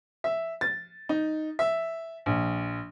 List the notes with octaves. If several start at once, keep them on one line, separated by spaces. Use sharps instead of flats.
E5
A6
D#4
E5
A#1